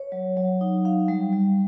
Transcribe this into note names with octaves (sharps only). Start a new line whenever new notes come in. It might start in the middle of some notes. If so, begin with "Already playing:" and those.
Already playing: C#5
F#3
F#3
D#4
F5
G3
G3